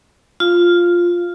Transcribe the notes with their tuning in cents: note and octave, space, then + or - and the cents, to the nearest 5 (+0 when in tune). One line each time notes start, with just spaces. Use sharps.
F4 +0 F5 -10